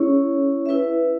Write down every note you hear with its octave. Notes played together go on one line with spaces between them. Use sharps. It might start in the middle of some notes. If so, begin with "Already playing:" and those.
Already playing: C#4 E4 G#4 C#5
E4 B4 E5